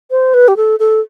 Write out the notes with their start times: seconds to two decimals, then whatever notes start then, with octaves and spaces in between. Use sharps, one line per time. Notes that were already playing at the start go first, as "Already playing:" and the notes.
0.11 C5
0.34 B4
0.48 G4
0.57 A4
0.80 A4